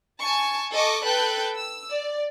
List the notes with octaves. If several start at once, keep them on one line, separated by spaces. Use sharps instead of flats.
G#5 A5 C#6
A4 D#5 C#6 D6
A4 B4 G5 F#6 G6
E6
D5